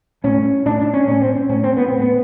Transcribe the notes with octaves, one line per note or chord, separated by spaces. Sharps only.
A2 C#4
A2 D4
D4
C#4
A2 C#4
C4
C#4
A2 C#4
C4
B3
A2 C4
B3